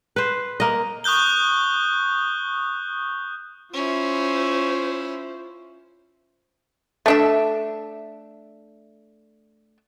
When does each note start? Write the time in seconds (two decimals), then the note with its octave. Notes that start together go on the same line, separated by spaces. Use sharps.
0.16 B4 C5
0.60 A#3 D#5
1.04 C#6 D#6 F#6 G6 G7
3.73 C#4 E4 F4 C5
7.06 A3 D4 E5